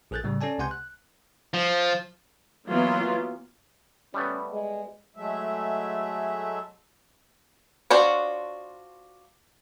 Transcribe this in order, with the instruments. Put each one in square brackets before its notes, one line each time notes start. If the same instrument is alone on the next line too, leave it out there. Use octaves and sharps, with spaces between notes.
[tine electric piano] A#1 G#4 A4 F#6 G6 A6
A2 C#3 G3
C#4 A4 D5 G#5 A5
C#2 C3 F#5 G#5 C6 G6
F#6
[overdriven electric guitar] F3
[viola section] E3 F#3 A#3 B3 F4
[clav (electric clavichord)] G3 A3 B3 [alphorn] C#4
[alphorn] G#3
[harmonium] F#3 G#3 A3 E5
[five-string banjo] D4 F4 F#4 C5 C#5